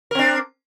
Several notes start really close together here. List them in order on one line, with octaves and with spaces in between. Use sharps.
A#4 C4 D4